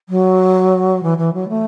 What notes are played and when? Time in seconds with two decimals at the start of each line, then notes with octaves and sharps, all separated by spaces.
0.09 F#3
1.03 E3
1.18 E3
1.33 F#3
1.48 A3